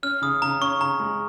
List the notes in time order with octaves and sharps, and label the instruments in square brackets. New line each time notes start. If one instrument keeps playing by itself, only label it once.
[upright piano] C#4 [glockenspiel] F6
[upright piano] C#3 [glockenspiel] D#6
[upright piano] C#3 [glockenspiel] A#5
[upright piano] C#4 [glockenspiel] C#6
[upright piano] C#3 [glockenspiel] A#5
[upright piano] G#3